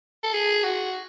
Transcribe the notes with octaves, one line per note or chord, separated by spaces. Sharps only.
A4
G#4
F#4